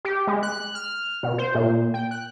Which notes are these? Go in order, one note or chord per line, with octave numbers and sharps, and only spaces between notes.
G4
G#3
F#6
F6
B2
C5
A#2
G5
F#6